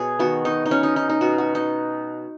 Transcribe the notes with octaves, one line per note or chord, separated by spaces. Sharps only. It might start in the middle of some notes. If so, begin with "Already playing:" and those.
Already playing: B2 G#4 C#5
D#3 B3 F#4
D#4
D#4
C#4
D#4
D#4
D#4
B2 B3 F#4
F#4
D#4